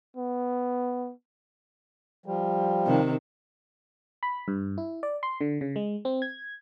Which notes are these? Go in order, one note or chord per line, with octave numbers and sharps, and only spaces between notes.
B3
F3 G3
C3 D#3
B5
G2
E4
D5
C6
D3
C#3
G#3
C4
G#6